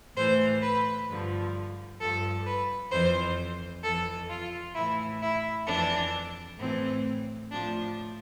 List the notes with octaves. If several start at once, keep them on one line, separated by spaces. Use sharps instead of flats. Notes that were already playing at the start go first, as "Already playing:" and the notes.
A2 E3 C5
B4
G2 D3 F3
G2 F3 A4
B4
F2 E3 C5
F2 E3 A4
F4
A2 E3 E4
E4
F2 E3 D4
A2 E3 C4
A2 F3 D4